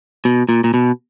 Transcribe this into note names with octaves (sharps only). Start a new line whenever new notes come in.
B2
A#2
A#2
B2